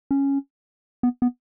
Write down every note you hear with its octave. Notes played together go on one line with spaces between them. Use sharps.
C#4
B3
B3